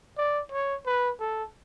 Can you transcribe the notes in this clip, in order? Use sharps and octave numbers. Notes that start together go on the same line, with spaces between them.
D5
C#5
B4
A4